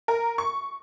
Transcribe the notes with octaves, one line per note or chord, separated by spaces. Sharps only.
A#4
C#6